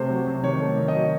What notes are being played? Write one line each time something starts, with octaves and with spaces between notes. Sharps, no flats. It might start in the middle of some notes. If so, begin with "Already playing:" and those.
Already playing: C3 A3 C5
F#3
C3
D#3 C#5
A3
D#3
D#5
F#3